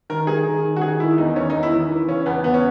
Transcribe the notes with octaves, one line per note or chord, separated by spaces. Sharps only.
D#3 A#4
D#3 G#4
D#3
D#3
F#4
D#3 G#4
D#3 E4
E2 D#4
D#3 C#4
E2 D#4
E4
D#3
E3
C#3 C#4
E2 B3
E2 B3
C#4